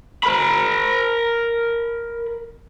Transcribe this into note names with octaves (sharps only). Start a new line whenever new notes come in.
A#4 B5